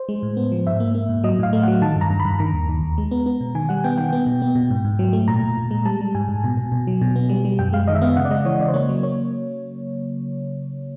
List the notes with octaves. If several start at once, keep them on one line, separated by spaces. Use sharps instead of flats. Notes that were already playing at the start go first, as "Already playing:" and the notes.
Already playing: C5
G#3
A2
B3
F3
G#2 E5
A#3
A#3
G#2
F#3 D#5
A2 F5
A3
F#3 F#5
D#3 A5
G2
A#5
G2
B5
G2
D#3 A#5
D#2
D#3
D#2
G#3
B3
B3
B2
D#3 G#5
G3 F#5
B3 G5
D#3 G5
B3
B2
B3
B2
G#2
G#2
F#3
A3
A#2 A#5
A#2
A#2
G#3
G3 A5
G3
G#2 G#5
G#2
B2
B2
B2
F#3
B2
B3
G3
G3
F#2 G5
G#3 F5
D#3 D#5
E5
B3 F5
C#3 F#5
D5
G#3 D#5
E3 C#5
C#3 D5
C5
A#3 C#5
F#3
A#3 C#5